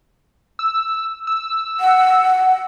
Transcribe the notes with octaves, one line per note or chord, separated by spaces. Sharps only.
E6
E6
F#5